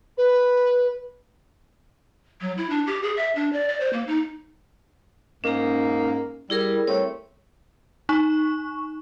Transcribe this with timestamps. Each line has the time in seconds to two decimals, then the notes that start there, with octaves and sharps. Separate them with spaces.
0.17 B4
2.41 F#3
2.57 E4
2.70 D4
2.87 G4
3.03 G#4
3.17 E5
3.35 D4
3.53 D5
3.68 D5
3.80 C5
3.93 A#3
4.07 D#4
5.44 G#2 A#3 C#4 D#4 A#5
6.50 G3 E4 G#4 A#4
6.87 G3 A3 C4 C#5
8.09 D#4 C#6